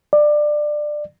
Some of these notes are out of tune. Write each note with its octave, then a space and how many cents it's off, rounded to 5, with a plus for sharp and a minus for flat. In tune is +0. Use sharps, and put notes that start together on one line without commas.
D5 +20